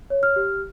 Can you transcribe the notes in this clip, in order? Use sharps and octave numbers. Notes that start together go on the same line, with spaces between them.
C#5
F6
G4